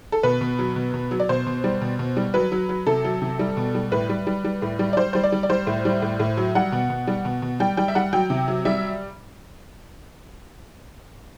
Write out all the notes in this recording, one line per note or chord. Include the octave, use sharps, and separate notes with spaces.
A4
B2 B4
B2
F#3
B2
B2
F#3
D5
B2 C5
B2
G3
B2
B2
G3
F#3 B4
F#3
F#3
C3 A4
F#3
C3
G3
B2
G3
A2 B4
G3
G3
G3
A2
G3
D5
G3 C5
G3 C5
D5
G3
D5
G3 C5
A2
G3
A2
A2
F#3
G3 F#5
B2
B2
G3
B2
B2
G3 G5
G3 G5
E5
G3 F#5
F#3 G5
C3
F#3
G3 E5